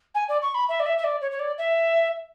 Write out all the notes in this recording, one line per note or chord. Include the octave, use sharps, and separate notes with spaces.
G#5
D5
C#6
B5
E5
D5
E5
E5
D5
C#5
C#5
D5
E5